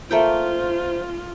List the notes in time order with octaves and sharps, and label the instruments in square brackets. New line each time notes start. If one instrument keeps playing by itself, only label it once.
[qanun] A3 A#3 G5 [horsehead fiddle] F4 [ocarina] C5